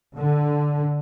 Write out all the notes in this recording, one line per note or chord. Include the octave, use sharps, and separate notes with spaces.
D3